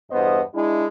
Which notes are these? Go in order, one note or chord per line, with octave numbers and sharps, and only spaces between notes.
E2 G2 B3 C5 D#5
G#3 D4 E4